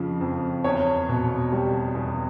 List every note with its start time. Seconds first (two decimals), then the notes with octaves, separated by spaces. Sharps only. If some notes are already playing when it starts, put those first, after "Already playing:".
Already playing: F2 C#3 F3
0.21 F2
0.64 E2 C#5
1.09 B2
1.52 G3
1.95 E2